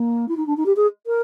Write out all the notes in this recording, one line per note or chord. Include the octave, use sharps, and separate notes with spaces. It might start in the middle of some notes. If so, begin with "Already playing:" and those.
Already playing: A#3
E4
D#4
D4
D#4
G4
G#4
A#4